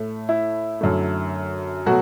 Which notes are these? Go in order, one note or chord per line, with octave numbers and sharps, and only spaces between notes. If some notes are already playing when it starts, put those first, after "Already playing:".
Already playing: A2 A3
E4
F#2 D3 A3
B2 F#3 A3 F#4